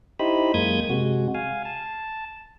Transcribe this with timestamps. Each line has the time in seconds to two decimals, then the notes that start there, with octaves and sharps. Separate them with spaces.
0.19 D#4 E4 G4 C5 D#5 B5
0.54 F#2 G#3 A#3 D#6 G6 G#6
0.89 C3 G#3 F#4
1.34 F5 G#5
1.65 A5